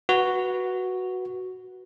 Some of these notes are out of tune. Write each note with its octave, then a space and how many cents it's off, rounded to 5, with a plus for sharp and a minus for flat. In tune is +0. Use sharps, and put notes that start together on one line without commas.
F#4 +0 B4 -10